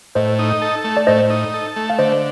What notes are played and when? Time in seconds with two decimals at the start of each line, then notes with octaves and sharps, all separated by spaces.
0.15 A2 C5 D#5
0.39 D#4
0.62 A4
0.84 A3
0.97 D5
1.07 A2 C5 D#5
1.30 D#4
1.54 A4
1.76 A3
1.90 F5
1.99 D3 C5 D#5